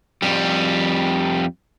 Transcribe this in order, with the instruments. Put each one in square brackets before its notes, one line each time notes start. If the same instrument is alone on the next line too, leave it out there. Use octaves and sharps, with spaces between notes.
[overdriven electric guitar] F2 G3